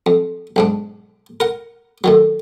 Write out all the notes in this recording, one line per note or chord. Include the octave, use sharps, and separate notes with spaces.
F2
B1 G#2 D4
A#4 F#5
A2 D#3 F#3